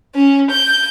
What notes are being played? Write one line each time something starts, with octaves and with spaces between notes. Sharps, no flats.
C#4
G6